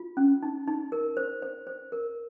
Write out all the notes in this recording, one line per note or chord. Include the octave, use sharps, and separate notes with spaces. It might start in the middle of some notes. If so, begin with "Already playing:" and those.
Already playing: F4
C#4
D#4
D#4
A#4
C5
C5
C5
A#4